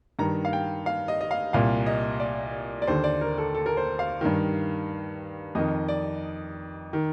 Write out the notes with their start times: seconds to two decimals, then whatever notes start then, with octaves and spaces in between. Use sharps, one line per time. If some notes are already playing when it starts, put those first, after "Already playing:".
0.19 G2 D#3 A#5
0.45 F5
0.53 G5
0.86 F5
1.08 D#5
1.21 D#5
1.31 F5
1.53 C2 A#2 F5
1.86 D#5
2.20 D5
2.82 D5
2.87 D#2 D3 C5
3.04 D5
3.21 A#4
3.38 A4
3.54 A4
3.66 A#4
3.77 C5
3.99 F5
4.21 G2 D#3
5.55 F2 D#3 D#5
5.88 D5
6.93 D#3